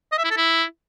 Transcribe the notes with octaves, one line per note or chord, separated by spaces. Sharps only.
D#5
E5
E4
A4
E4